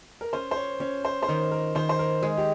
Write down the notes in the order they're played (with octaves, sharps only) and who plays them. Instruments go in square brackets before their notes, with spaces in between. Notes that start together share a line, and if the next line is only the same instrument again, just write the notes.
[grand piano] A#4
[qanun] C#4 [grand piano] C5
[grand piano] C5
C#5
[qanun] C#4 [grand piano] C#5
[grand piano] C5
C5
[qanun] D#3 [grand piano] A#4
[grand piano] A#4
[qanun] D#3 [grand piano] C5
[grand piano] C5
A#4
[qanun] G#3 [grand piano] G#4
[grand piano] G4